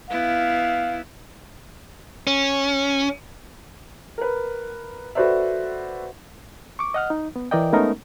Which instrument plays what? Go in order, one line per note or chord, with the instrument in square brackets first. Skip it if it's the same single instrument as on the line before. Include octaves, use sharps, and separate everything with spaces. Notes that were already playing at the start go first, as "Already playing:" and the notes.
[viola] B3 E4 [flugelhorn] F5
[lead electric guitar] C#4
[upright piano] A#4 B4
F#4 A4 B4 C5 D5 E5
[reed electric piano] C#6 D6
D#5 F#5 F6
D#4
B3
E3 A#4 D5 D#5 G5
G#3 A3 B3 C#4 D#4 A#4